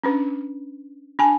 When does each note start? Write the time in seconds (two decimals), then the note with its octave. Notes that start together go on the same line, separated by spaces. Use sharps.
0.03 C#4 D4 B4
1.19 D4 G#5 A5